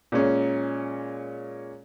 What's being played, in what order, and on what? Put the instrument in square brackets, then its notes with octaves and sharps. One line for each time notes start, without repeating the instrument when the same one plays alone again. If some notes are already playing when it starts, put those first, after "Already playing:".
[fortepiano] A#2 G#3 C#4